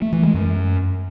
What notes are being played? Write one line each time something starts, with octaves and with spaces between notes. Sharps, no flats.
A3
E3
G#3
F#2